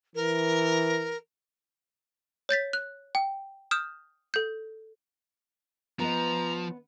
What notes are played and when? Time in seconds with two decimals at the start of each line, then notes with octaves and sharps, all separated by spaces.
0.15 E3 A#4
2.49 C#5 G6 A6 B6
2.73 F#6
3.15 G5
3.71 D#6 F6 G6 E7
4.34 A4 G6
5.99 F3 B3 B4 D#5 A#5